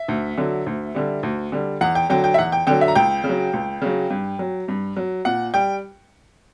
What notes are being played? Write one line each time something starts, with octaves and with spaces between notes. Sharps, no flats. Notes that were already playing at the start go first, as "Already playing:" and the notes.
Already playing: E5
D2
D3 F#3
D2
D3 G3
D2
D3 G3
E2 F#5
G5
D3 F#3 G5
G5
E5
E2 F#5
G5
D3 F#3 G5
E5
A#5
C#2 G5
C#3
F#3
C#2
C#3 F#3
G2
F#3
G2
F#3
A#2 F#5
G3 G5